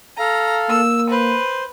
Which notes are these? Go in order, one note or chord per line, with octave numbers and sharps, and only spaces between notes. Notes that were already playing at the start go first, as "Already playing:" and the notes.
A4 F5 A#5
A#3 E6
B4 C5